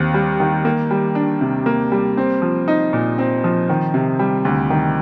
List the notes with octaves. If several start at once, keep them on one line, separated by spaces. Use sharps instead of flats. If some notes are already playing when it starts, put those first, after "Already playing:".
Already playing: D#2 D#3 C4
G3
D#3
A#3
G3
D4
C3
A#3
G3
C4
F3
D#4
A#2
C4
F3
D#3
C3
G3
D2
D#3